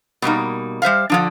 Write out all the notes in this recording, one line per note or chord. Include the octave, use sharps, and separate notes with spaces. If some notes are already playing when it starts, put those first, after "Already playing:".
B2 G3 A#3 D#4
G3 C5 E5 F5
D3 F3 D4